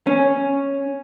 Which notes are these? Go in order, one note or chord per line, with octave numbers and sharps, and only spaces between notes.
C#4